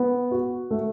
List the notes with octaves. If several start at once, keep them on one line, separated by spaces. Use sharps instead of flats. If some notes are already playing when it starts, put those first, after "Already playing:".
Already playing: B3
F#4
A3